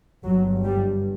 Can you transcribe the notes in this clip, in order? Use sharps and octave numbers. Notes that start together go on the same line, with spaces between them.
G1 G2 F#3
G3